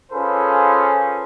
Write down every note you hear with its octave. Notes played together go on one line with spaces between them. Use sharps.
C#4 F4 G#4 A4 B4 C5